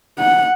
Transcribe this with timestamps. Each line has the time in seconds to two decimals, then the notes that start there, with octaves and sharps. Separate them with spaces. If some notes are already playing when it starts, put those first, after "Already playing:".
0.19 F#5